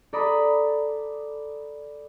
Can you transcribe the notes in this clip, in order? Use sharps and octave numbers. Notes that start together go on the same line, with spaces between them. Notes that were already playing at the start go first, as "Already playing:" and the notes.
A4 D5 A#5 B5 D#6